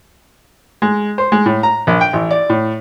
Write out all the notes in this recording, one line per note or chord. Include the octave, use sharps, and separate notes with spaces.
G#3
C5
G#3
A2
A#5
A#1
G5
A1
D5
A2